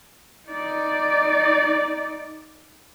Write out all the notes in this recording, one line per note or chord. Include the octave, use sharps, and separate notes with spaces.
D#4 D5